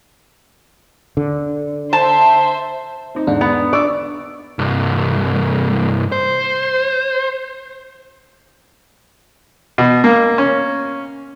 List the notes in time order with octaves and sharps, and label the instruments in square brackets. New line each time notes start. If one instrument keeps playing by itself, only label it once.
[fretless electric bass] D3
[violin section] C5 E5 [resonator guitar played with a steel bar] A5
[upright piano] C4 D#4
[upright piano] E2 G#2 D3 [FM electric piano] D4
[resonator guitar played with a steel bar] B3
[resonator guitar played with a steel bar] D5 [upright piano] C#6 E6
[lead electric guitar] C2 G2
C5
[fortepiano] B2
A#3
C#4